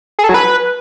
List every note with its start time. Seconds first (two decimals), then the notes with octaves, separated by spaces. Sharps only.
0.19 G#4
0.24 A4
0.29 F#3
0.34 B4